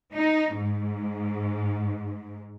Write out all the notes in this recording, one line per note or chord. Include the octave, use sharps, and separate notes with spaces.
D#4
G#2